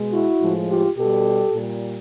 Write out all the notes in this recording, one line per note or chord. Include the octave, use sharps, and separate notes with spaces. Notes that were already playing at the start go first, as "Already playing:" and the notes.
Already playing: B2 G#3
E4 F#4
A2 F3 G#3
F4 G4
B2 G3 G4 A4
A#2 G3